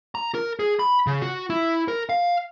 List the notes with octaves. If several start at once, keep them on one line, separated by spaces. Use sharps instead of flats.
A#5
A#4
G#4
B5
C#3
F#4
E4
A#4
F5